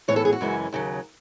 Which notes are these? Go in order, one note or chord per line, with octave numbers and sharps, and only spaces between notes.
A2 E3 B3 C#5
A4
G#4
F#4
F#2 C#3 E3 G#3 C#4
D#2 C#3 F#3